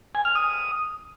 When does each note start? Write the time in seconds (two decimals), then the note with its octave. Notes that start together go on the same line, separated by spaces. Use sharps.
0.15 G#5
0.25 F6
0.35 D#6